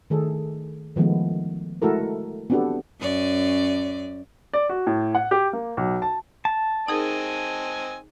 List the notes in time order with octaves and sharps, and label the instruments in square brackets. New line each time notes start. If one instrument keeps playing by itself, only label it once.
[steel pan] D#3 A3 G#4 A4
D#3 F3 G#3 A3 B3
G#3 A3 E4 F#4 A4 A#4
B3 C4 D4 F#4 G4 A4
[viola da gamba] F#2 C#4 D5
[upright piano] D5
F#4
A2
F#5
G4
A#3
B1
A5
[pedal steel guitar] A5
[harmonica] C4 D#5 G#5 [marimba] D#4 G#4 A#4